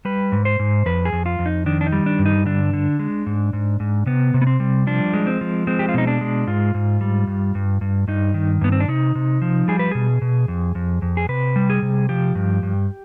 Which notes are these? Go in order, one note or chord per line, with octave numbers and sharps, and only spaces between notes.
G3 B4
G#2
C5
G#2
F2 B4
G#4
F2
F4
F2
D#4
D#3 D4
D4
D#4
G3
D4
G2
D#4
D3 D4
D3
G#3
G#2
G#2
G#2
C3 B3
C3
B3
C4
G3
F3 D4
G#3
C4
F3
G#3 C4
G4
F4
B2 D#4
D4
G#3
G#2 F4
G#2
G3
G2
G2
G2
G2 D#4
D#3
G2 B3
C4
D4
C3 D#4
C3
F3
G3 G#4
B4
B2 G#4
B2
F2
F2
F2
G#4
C3 B4
G3
G#4
C3
F3 G4
G2
G2